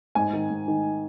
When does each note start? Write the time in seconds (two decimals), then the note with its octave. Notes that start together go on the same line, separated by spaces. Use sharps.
0.15 G#2 G#5
0.33 D#3
0.50 G#2
0.68 D#3